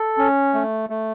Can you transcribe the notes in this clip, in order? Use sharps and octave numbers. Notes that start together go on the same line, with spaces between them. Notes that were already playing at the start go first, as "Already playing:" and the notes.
Already playing: A4
C#4
A3
A3